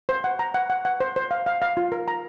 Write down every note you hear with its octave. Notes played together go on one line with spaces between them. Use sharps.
C5
F#5
A#5
F#5
F#5
F#5
C5
C5
F5
F5
F5
F4
A#4
A#5